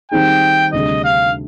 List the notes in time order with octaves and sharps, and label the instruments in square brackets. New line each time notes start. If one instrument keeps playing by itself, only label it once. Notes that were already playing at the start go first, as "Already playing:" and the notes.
[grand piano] D#3 G3 C4 D#4 G#4 [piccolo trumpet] G5
[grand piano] D2 C3 G3 D4 G#4 [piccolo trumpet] D#5
[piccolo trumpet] F5